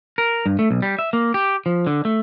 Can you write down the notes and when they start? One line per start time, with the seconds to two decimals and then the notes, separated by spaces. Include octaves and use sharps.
0.18 A#4
0.46 G2
0.59 A3
0.71 B1
0.82 G3
0.99 E5
1.13 A#3
1.34 G4
1.66 F3
1.87 D3
2.05 A3